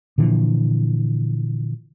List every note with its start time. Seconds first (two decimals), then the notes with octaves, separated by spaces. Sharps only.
0.18 A#2 D3 E3 F3